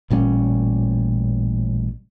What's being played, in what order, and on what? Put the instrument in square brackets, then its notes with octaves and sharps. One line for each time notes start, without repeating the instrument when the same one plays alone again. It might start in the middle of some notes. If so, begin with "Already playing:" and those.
[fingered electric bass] A1 A#2 G3 C#4